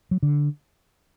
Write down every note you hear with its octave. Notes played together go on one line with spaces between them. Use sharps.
F#3
D3